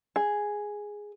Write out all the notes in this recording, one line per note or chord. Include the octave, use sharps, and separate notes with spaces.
G#4